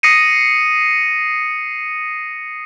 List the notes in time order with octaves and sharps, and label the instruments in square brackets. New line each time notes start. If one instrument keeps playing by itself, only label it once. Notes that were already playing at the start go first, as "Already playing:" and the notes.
[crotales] D#6 A#6 C7 C#7 D#7